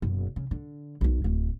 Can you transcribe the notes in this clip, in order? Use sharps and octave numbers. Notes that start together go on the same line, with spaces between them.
F#1 B2
C#3
D3
B1 D#3
D1 A3